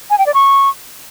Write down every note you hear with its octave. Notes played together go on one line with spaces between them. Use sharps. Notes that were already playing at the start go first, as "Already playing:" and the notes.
G#5
G5
D5
C#6